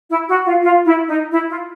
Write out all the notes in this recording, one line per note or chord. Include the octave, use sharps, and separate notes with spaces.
E4
F#4
F4
F4
E4
D#4
E4
F4